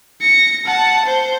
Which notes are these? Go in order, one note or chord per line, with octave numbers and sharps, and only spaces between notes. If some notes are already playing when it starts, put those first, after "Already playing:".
A#6 C#7
F#5 A5
C5